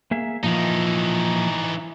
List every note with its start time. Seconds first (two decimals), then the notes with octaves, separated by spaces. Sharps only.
0.11 A#3 G#4 E5
0.43 A#2 E3 F3 D#4